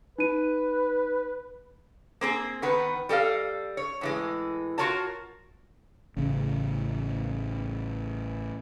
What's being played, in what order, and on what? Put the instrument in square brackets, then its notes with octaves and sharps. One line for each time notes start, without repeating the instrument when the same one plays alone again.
[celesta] D#4 D#7 [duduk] B4
[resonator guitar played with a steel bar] A#3 C4 G#4
D#3 B3 B4
G3 A4 D#5 F5
C#5
A2 E3 G#3
F4 F#4 A#4 C#5 A5
[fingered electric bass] A1 C#3